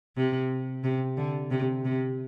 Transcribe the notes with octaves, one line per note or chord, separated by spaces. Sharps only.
C3
C3
D3
C3
C3